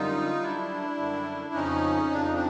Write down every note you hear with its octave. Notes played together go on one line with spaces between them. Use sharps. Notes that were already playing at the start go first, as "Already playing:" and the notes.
Already playing: F#2 D3 G3 D#4 F4
F#2 D3 G3 D4 E4
F#2 D3 G3
F2 C#3 F3 C#4 D#4
F2 C#3 F3 D4
D#4
C4 D4